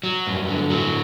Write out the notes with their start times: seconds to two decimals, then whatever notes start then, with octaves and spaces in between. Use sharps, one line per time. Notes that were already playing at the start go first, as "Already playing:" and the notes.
0.03 F#3
0.27 G2
0.49 D3
0.70 F#3